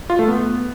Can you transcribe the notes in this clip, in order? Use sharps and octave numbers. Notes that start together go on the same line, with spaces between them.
F4
A3
B3